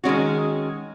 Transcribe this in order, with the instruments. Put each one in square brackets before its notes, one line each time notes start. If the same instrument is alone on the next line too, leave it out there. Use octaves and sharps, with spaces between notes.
[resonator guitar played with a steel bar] D#3 G#3 C#4 F#4